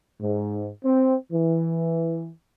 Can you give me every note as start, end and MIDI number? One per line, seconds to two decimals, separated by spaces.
0.21 0.69 44
0.83 1.14 60
1.31 2.30 52